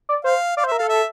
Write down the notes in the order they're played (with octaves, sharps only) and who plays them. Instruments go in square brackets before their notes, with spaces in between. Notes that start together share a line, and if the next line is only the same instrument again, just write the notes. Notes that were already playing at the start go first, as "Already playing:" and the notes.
[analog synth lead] D5
[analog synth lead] C5 [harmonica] F5
[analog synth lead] D5 [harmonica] F5
[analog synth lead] C5
[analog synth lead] A#4 [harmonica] E5
[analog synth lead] A4 [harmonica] F5
[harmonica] E5